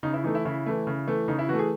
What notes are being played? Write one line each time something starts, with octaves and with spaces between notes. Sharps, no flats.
C#3 D#4
E4
E3 A3 D#4
E4
C#3 E4
E3 A3
C#3
E3 A3
C#3 D#4
E4
E3 A3 F#4
G#4